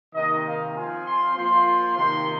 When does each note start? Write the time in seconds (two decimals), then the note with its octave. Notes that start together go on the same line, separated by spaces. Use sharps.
0.14 C3 D#3 A#3 D#5
0.45 F5
0.76 F3 C4 F4 G#5
1.05 C6
1.36 F3 A#3 F4 C6
1.66 C6
1.96 C3 D#3 A#3 D#4 C6